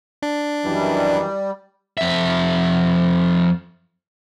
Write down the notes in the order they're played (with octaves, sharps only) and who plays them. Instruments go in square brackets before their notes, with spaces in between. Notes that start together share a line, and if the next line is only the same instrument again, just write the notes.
[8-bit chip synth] D4
[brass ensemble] F#2 D#3 E3 [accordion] G3
[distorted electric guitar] F2 E5